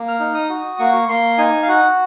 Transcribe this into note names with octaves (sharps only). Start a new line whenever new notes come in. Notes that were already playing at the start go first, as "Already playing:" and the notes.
Already playing: A#3
F6
D#4
D#6
F#4
A#3 C#6
A#3 C6
D#4 G#5
F5
F#4 F#5